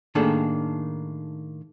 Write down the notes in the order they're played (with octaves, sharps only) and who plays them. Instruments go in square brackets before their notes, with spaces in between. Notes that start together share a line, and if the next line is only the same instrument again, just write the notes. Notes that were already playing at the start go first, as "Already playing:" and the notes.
[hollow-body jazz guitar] A2 D#3 A#3 D4 G#4 A4